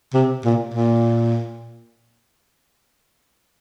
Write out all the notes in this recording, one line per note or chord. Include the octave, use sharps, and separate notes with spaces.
C3
A#2
A#2